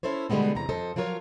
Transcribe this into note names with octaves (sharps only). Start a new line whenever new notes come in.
C#4 E4 A4 C5 C#5
B2 D3 G3 G#3 B3 C4
E2 C3 A#5
F2 A4 C5 D#5
F3 F#3 F4 A#4 C#5